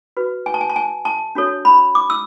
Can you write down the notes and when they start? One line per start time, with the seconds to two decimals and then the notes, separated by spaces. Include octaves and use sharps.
0.17 F#4 B4
0.46 G#5
0.54 A5
0.61 G#5
0.70 A5
0.76 G#5
1.05 A5
1.35 D4 F#4 A4 C#5
1.65 B5
1.95 D6
2.10 E6